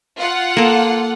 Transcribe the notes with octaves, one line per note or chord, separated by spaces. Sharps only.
F4 F#5
A#3 A4